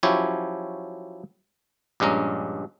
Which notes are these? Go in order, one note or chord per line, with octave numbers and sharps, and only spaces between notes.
F3 F#3 C#4 E4 G4 C#5
A#1 G2 G#3 C#4 A#5